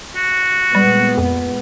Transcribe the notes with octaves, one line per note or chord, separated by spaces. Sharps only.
F#4
A#2 G3 G#3 B3
F2